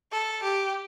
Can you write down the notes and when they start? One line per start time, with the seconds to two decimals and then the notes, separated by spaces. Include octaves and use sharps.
0.12 A4
0.43 G4